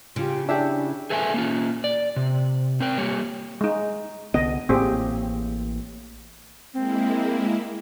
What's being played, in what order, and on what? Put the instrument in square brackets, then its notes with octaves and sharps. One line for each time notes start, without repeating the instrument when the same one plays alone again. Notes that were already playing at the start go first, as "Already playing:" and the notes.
[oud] C#3 [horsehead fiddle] F4 G4
[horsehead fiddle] C#4 E4 [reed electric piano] D4 [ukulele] G4 G#4 E5
[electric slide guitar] G#4 A4 B4 E5 F#5 G#5
A#3 C#4 F4
D5
C3
C4 A#4 G5
G3 A#3 G4 C#5
[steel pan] G#3 D#4
[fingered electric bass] C2 D3 B3 [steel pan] D#5
[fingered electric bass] A1 A2 A#3 [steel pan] C4 G4 G#4
[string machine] G#3 A#3 E4 [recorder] C4